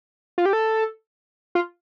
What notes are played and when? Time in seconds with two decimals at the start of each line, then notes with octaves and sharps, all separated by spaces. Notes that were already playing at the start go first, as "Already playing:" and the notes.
0.38 F4
0.46 G4
0.53 A4
1.55 F4